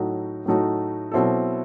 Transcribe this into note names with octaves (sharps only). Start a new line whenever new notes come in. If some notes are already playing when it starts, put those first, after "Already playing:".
Already playing: A2 F#3 A3 D#4 F#4
A2 F#3 A3 D#4 F#4
B2 F#3 C4 E4 A4